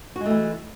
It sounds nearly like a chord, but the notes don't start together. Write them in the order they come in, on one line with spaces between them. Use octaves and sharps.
F#4 G#3 A3 E3